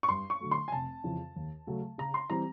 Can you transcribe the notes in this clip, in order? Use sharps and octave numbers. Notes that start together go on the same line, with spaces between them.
C#6
G2 C6
C#6
D3 F#3 A3
C6
G#5
F1 A5
F2 C#3 E3
D#2
C#3 F#3 A3
C#3 A#5
C6
E3 G3 C4 A#5